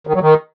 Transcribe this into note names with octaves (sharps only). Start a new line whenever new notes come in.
D#3
F#3
D#3